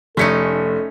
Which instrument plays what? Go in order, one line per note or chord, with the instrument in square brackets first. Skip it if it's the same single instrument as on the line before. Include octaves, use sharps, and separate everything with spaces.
[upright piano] F1 B6 C#7 [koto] A3 C#4 D#4 [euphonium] A4